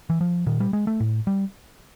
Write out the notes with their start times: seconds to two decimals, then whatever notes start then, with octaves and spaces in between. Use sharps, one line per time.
0.10 E3
0.21 F3
0.47 A#2 D#3
0.60 G3
0.73 G#3
0.87 A3
1.00 A2
1.27 G3